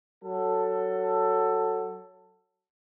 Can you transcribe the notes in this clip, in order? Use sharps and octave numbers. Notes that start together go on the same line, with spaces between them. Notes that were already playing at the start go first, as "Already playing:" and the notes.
F#3 A4